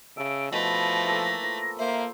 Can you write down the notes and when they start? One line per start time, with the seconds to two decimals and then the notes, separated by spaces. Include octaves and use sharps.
0.17 C#3 E5 A5 D7
0.52 B2 E3 F3 A3 B4 A#6
1.05 E3 A#3 A4
1.43 F3
1.78 A#3 C5 E5